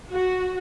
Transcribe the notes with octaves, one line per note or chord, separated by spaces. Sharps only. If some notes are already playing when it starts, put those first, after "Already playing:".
F#4